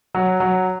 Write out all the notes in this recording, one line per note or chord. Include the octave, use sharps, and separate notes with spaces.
F#3
F#3